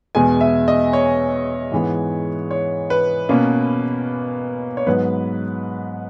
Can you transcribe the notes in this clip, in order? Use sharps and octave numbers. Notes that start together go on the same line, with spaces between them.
E2 B2 G#3 G#5
E5
D#5
C#5
G#2 E3 G#3 B3
C#5
B4
B2 A#3 C#4
C#5
G#2 F#3 B3 B4